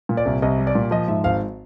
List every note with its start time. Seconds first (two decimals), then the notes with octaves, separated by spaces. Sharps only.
0.09 A#2
0.17 D5
0.25 C2
0.42 C2 D#5
0.58 G3
0.67 D5
0.75 A#2
0.91 F3 D#5
1.08 G#2 E5
1.24 G#1 F5